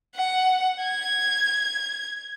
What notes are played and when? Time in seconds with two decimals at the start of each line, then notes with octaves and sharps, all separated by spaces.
0.15 F#5
0.83 G#6